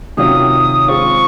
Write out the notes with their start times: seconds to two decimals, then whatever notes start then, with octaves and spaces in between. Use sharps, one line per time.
0.17 C3 D#3 F#3 C#4 F4 D#6
0.88 G#3 C4 F4 C#6